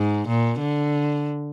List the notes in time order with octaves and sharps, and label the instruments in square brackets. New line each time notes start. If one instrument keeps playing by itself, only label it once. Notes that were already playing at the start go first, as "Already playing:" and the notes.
Already playing: [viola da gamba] G#2
A#2
D3